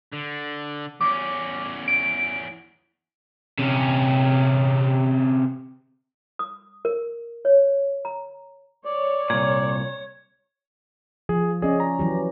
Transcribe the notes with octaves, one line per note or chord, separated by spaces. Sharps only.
D3
E2 C#4 D6
D7
C3 C#4
D#6
A#4
C#5
A#5
C#5 D5
C2 A#2 G#6
F3 G#4
C#4 G#4 D5 D#5
A#5
E3 F#3 G4